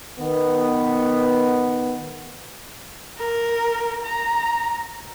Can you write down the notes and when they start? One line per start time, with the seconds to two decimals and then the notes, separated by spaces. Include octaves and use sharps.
0.20 D#3 B3
3.18 A#4
4.04 A#5